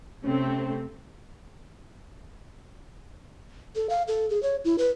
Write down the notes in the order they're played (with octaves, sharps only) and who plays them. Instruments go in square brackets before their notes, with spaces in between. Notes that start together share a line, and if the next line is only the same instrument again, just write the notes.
[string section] C3 A3 C4 [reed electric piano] C#4
[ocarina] A4
F5
A4
G#4
C#5
E4
B4